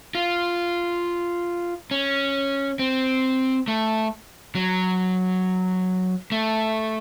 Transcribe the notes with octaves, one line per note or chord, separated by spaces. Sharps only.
F4
C#4
C4
A3
F#3
A3